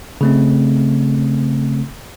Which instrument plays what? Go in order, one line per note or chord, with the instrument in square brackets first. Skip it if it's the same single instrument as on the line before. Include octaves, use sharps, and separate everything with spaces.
[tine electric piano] C#3 A3 C4